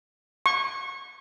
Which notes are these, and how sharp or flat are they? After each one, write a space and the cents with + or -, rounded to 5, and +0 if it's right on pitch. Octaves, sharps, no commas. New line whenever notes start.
C#6 -25